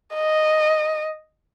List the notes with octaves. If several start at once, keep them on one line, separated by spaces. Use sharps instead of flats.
D#5